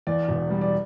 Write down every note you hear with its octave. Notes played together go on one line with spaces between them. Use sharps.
E2 D5
E1
G3
D5